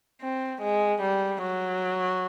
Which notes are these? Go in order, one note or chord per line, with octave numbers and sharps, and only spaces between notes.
C4
G#3
G3
F#3